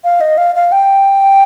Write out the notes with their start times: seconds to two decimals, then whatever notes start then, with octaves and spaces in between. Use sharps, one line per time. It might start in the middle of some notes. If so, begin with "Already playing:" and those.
0.04 F5
0.21 D#5
0.38 F5
0.55 F5
0.72 G5